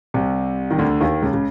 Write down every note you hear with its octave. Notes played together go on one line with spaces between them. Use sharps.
C2 C3
D#3
D2 D3
D#2 D#3
C#2 C#3
C#3